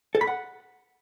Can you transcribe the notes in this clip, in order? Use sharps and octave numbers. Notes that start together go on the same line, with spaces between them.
A4
B5
F#5